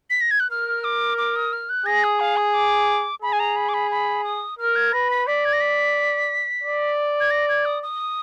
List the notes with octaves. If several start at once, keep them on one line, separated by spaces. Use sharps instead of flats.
B6
A#6
G#6
F#6
A#4 F6
D6
D6
D#6
F6
F#6
G#4 A#6
D#6
F5
D#6
D6
G#4 B5
G#5
A#5
B5
D6
B5
B5
D#6
A#4 F6
G#6
B4 A#6
B6
D5 B6
G#6
A#6
B6
D5
G#6
A#6
G#6
D#6
D#6